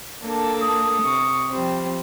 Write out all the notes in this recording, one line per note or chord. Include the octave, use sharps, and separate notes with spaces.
A#3 D4 A4
D#6
C3 C#6
F3 G3 C4